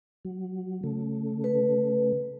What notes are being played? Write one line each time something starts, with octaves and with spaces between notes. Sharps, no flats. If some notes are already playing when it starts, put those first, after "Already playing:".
F#3
C#3 A3
B4